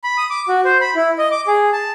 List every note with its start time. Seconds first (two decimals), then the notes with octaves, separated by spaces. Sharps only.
0.04 B5
0.18 D#6
0.30 D6
0.48 F#4
0.65 C5
0.81 B5
0.95 E4
1.18 D#5
1.31 D6
1.47 G#4
1.73 A5